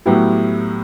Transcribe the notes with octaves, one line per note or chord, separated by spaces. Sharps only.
A2 F#3 B3 E4 G4